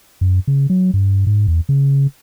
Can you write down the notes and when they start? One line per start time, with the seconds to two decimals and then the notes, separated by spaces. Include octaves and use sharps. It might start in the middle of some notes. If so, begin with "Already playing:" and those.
0.21 F#2
0.47 C#3
0.70 F#3
0.94 G2
1.27 G#2
1.48 E2
1.69 C#3